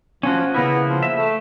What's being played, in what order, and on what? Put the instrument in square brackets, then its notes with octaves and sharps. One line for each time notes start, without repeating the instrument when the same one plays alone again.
[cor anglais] F3 [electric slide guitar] C#4 F#4
[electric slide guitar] C#3 A#3 E4 [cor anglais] B3
[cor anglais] F3
[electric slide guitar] E5
[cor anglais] A3